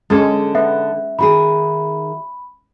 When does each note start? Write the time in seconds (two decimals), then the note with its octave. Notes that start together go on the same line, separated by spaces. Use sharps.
0.10 D3 G#3 C#4 A4
0.55 B3 E5
1.19 D#3 F#4 G#4 B5